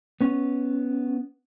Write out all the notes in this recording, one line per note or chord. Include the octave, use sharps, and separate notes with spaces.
B3 C#4